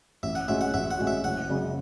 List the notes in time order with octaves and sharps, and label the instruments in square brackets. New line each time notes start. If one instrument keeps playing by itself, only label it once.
[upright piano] A1 [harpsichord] E5
[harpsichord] F#5
[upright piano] A2 G#3 C#4 F#4 [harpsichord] E5
[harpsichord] F#5
[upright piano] A1 [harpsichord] E5
[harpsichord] F#5
[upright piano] A2 G#3 C#4 F#4
[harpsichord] E5
[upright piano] F#1 [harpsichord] F#5
[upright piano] F#2 C#3 G#3